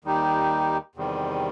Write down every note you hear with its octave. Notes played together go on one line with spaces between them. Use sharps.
D#2 D#3 G3 D#4 G4
E2 C3 D#3 G3